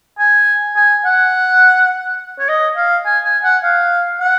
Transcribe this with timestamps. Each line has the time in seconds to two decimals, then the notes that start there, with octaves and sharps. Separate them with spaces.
0.19 G#5
0.76 G#5
1.05 F#5
2.39 C#5
2.49 D#5
2.77 F5
3.05 G#5
3.25 G#5
3.44 F#5
3.63 F5
4.20 F#5